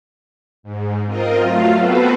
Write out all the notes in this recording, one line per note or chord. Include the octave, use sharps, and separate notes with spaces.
G#2
C4 F4 A#4 D#5
F#3 A3 F4 F5
B3 C4 F#4 A4 B4 C5